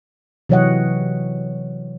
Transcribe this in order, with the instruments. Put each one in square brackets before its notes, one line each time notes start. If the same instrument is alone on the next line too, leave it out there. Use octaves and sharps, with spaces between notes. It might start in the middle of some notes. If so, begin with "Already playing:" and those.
[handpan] C3 E3 F#3 C#5 D#5 F#5